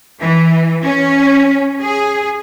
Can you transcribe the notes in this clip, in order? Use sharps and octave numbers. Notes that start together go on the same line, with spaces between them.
E3
C#4
G#4